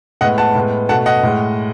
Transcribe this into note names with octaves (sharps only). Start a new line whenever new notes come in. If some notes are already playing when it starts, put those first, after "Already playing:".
A2 G#3 B3 D#5 F#5
F#5 A5
A2 G#3 B3
B2 A3 F#5 A5
D#5 F#5
A2 G#3